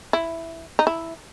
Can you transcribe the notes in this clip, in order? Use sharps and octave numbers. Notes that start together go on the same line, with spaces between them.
E4
D#4
E4